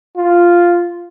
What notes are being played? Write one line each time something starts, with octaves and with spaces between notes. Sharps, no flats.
F4